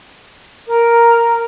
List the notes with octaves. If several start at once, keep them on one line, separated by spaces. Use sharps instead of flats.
A#4